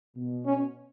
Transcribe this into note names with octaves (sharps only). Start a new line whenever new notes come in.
B2
C#4